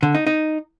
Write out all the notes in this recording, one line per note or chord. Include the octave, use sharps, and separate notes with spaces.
D3
D#4
D#4